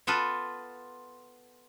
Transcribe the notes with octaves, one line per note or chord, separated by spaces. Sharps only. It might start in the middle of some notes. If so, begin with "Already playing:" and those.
B3 F4 A4 B4